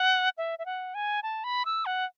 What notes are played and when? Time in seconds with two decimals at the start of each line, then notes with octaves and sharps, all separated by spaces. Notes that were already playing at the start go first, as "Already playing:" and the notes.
Already playing: F#5
0.38 E5
0.59 E5
0.66 F#5
0.94 G#5
1.23 A5
1.44 B5
1.65 E6
1.86 F#5